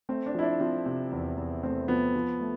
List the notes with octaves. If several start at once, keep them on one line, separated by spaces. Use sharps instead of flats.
A3 C4
D4
F3 E4
D4
F3 C4
C3
E2
E2
A3 C4
F3 B3
F3
A3